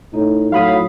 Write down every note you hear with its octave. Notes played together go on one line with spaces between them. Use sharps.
A2 D#4
A2 F#3 F5 B5 D#6